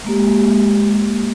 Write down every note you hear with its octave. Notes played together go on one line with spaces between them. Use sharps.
G#3 A#3 G4